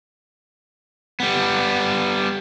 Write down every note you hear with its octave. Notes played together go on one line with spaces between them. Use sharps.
G3 B3